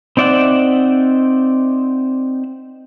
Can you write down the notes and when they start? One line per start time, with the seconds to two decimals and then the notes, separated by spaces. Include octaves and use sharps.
0.17 C4 D#4 D5 E5 F#5